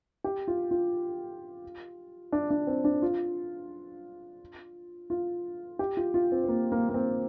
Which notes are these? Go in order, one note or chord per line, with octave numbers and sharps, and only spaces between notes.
G4
F4
F4
D4
D4
C4
D4
F4
F4
G4
F4
F4
C4
C4
A#3
A#3
A#3
C4